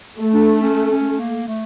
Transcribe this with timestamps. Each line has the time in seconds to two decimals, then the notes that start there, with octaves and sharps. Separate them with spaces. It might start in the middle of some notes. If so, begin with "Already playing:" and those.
0.19 A3
0.34 D4
0.62 C#4
0.91 C#4
1.19 A#3
1.48 A3